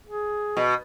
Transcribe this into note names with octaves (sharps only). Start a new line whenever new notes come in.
G#4
B2